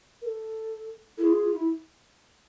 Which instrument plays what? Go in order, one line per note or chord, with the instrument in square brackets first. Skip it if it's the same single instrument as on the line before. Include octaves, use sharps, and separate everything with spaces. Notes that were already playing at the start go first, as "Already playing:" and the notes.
[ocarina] A#4
A4
[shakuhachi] E4 [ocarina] G#4 A4
[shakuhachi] F4
F4
E4